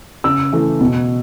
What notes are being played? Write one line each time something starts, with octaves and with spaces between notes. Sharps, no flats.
C#3 E6
E3 A3
B2